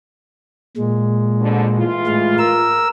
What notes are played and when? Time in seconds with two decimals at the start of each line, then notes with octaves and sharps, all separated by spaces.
0.77 A#2 G#3
1.40 F2 B2 D3
1.75 E3 F4
2.07 A2 G#3 F5
2.39 A#4 E6